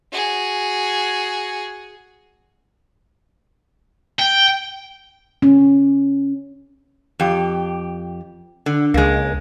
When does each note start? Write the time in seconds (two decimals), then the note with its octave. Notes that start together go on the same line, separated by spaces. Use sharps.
0.12 F#4 G#4
4.20 G5
5.42 C#4
7.20 F2 G4
8.66 D3
8.94 C#2 G#3 A#3